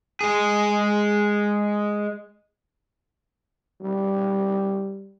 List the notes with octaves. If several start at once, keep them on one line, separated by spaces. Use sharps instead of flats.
G#3 G#4
G3